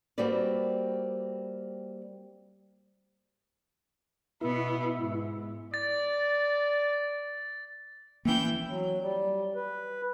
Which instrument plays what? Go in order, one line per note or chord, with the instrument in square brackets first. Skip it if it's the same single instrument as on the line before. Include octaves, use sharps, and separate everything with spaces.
[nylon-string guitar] G3 A#3 C4 F#4 B4 D5
[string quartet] B2 B3 [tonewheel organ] E4
[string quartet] G#2
[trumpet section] D5 [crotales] A6
[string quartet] E3 G5 G6 [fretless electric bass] A#3 C#4
[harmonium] F#3
G3
B4